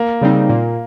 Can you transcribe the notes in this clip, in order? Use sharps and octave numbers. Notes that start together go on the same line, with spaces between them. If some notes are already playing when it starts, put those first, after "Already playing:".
Already playing: A#3
C#3 G3 C4 D#4
A#2